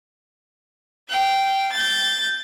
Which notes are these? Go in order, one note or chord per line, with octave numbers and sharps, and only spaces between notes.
F5 G5
G6 A6